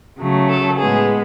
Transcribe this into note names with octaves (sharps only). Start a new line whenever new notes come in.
C#3 F#3 A3
A4
A2 G#3 B3 G#4